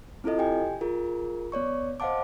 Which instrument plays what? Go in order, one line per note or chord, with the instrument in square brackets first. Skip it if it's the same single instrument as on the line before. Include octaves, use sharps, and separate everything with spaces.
[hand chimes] C4 E4 F4 A4 D#5
G4 G5 G#5
F4 G#4 A#4
B3 C#5 D5 C#6
C5 D#5 F5 F#5 A5 D6